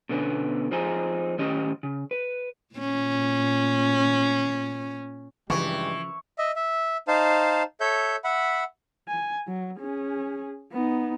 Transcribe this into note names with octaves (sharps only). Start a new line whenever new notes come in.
B2 D3 B3 C#4
F3 C4 D#4 G#4
A2 D#3 C#4 G4 D#5
C#3
B4
A#2 C#4
G2 C#3 E3 F3 G#3 G4 C#6
D#5 E5
E5
D#4 C5 F5 A5
A4 C#5 E5 G6
E5 F#5 B5
G#5
F#3
C#4 G#4
B3 D#4